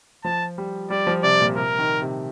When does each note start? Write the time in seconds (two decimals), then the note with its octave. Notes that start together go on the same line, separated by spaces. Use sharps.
0.24 F3 A5
0.58 G3
0.90 G3 D5
1.07 F3
1.23 C3 D5
1.41 A#2
1.56 C3 A#4
1.79 D#3
2.02 C3